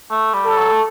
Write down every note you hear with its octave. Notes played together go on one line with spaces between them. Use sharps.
A3
G3
A4
F#3
A3